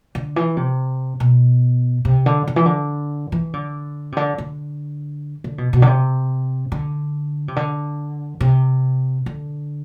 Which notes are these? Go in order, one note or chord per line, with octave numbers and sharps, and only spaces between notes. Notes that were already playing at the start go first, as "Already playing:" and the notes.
D3
E3
C3
B2
C3
D3
D3
E3
D3
E3
D3
C3
D3
D3
D3
B2
B2
D3
C3
D3
C3
D3
C3
D3